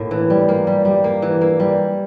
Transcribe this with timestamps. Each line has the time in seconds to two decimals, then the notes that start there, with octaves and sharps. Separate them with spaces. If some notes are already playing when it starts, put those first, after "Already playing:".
Already playing: A2 A#3
0.11 E3
0.30 G3
0.49 A#3
0.67 G3
0.85 G3
1.04 A#3
1.22 E3
1.41 A#3
1.60 G3